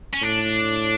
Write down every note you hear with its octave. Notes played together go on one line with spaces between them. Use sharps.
C#4
A2 D4